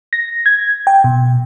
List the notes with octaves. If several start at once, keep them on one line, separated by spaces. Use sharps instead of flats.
A#6
G#6
G5
B2